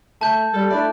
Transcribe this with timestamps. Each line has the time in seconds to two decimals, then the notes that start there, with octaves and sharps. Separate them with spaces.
0.21 A3 A5 G6
0.53 G3 A4
0.70 A3 D4 E4 D5